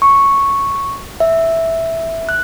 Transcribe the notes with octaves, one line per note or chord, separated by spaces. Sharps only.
C#6
E5
F#6